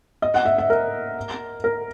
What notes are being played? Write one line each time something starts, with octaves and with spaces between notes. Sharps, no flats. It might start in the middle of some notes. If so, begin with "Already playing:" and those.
D#5
F#5
E5
E5
A#4
A#4